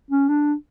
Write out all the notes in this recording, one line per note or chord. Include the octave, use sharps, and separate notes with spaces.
C#4
D4